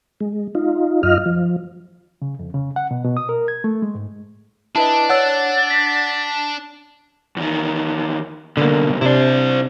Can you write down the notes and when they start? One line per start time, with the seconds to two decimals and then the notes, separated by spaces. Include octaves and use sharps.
0.21 G#3
0.55 D#4 F4
1.03 F#2 F4 D#5 F6
1.26 F3
2.22 C#3
2.39 F2
2.54 C#3
2.76 F#5
2.91 B2
3.05 B2
3.17 D#6
3.29 A#4
3.48 G#6
3.64 A3
3.82 G#3
3.95 G#2
4.75 D4 E4 B4 D#5 A5
5.10 C#5 F#5 E6 F#6 A6
5.70 B6
7.37 E2 D#3
8.57 C2 B2 D3 A#3
9.01 C3 D4 E4 C5